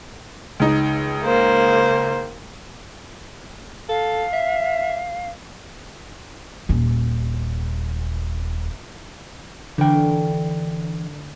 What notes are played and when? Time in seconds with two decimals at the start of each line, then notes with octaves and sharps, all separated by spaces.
0.60 C#2 D#4
1.25 A#3 C5
3.89 A4 F5
4.33 E5
6.69 D#1 C#4
9.78 D3 E3 G5